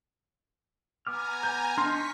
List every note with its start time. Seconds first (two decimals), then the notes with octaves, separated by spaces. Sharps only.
1.07 B3 G#5 A#5 D6 F6
1.43 G6
1.78 D4 D#4 C6 C#6 F6 B6